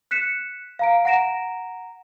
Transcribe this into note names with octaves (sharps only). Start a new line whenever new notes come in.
F#6 B6 C#7 E7
F5 A#5 D7
F#5 A#5 A#6 D7 E7